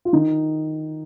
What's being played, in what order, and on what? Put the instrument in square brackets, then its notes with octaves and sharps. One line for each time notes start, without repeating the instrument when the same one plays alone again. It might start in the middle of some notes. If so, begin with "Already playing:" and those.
[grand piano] F4
D#3 D#4